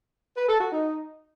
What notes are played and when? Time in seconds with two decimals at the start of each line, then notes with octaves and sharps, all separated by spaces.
0.37 B4
0.48 A4
0.60 F#4
0.72 D#4